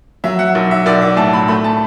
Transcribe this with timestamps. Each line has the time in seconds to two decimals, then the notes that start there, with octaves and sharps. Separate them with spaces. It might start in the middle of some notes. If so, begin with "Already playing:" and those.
0.24 F#3 E5
0.39 F#5
0.55 B1
0.71 E5
0.86 B1 D5
1.02 E5
1.17 A2 A5
1.33 B5
1.48 A3 B5
1.64 A5